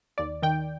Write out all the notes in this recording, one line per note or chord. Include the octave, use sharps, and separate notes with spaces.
D#2 D5
D#3 G5